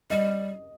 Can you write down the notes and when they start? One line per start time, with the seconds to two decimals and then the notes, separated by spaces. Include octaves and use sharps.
0.10 G3 D#5